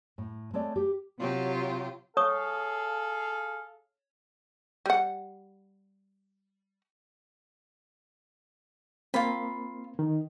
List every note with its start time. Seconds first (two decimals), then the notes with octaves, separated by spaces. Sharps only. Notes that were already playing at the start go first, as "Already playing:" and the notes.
0.18 A2
0.53 G#3 A3 C4 C#5 D5
0.76 G4
1.19 C3 F#3 F4 G4
2.17 G#4 A4 C#5 F5 C#6 D#6
4.86 G3 F#5
9.14 A#3 C4 F4 B5
9.99 D#3